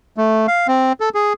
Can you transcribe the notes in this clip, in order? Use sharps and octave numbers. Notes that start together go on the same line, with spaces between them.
A3
F5
C4
A4
G#4